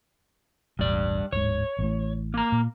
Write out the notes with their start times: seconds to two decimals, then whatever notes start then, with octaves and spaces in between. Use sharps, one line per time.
0.79 E1 A1 G2 D5
1.32 D1 G#2 C#5
1.79 A1 A2
2.34 A#3 A#5
2.52 A#2